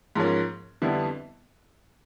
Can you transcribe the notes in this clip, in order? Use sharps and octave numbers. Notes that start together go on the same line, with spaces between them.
G#2 F3 A#3 C#4
F2 D3 G3 B3 E4